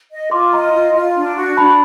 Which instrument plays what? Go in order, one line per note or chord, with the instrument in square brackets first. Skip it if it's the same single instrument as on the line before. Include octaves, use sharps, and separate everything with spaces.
[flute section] D#5
[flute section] F4 [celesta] C6 D6
[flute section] D#5 [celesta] A#5 C6
[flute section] F4
F4
D4
F#4
[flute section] D4 [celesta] A5 B5